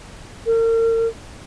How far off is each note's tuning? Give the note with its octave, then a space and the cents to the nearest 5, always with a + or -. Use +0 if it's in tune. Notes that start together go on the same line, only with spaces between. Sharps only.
A#4 -40